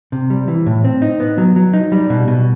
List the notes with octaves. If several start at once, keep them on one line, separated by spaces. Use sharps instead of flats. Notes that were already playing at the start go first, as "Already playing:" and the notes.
C3
G3
E3
A2
C4
D#4
B3
F#3
F#3
D#4
G3
B2
B2